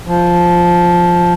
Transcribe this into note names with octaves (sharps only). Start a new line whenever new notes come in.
F3